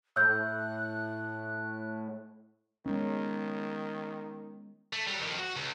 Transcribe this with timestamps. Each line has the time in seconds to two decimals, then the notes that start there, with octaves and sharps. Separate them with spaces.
0.16 A2 E6 F#6 G6
2.86 D#3 G#3 B3 C#4
4.93 A3
5.07 F#3 G3
5.19 F2 D#3
5.39 F#4
5.56 C#2